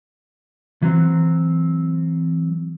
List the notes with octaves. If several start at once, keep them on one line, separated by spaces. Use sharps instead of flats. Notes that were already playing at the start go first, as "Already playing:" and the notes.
E3 F#3 C4